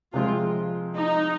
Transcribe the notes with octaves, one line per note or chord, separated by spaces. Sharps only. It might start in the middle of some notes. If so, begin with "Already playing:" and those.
C3 F3 G#3 C4 F4
D#4